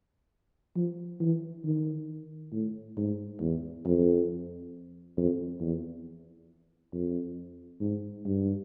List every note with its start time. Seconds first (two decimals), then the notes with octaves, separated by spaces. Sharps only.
0.76 F3
1.20 E3
1.65 D#3
2.52 A2
2.97 G#2
3.41 E2
3.85 F2
5.17 F2
5.60 E2
6.93 F2
7.81 G#2
8.25 G2